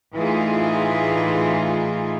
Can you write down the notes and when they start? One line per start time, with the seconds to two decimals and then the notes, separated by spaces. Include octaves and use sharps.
0.15 A2 E3 D#4 F4 G#4